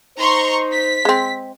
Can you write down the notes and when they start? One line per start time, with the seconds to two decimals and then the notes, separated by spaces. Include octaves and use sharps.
0.18 D#4 C5 A#5 C6 C#6
0.74 B6
1.05 G#3 C4